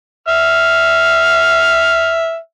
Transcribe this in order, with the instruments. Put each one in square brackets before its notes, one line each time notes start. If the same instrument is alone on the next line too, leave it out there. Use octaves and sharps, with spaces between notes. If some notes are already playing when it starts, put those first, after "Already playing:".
[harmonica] E5 F6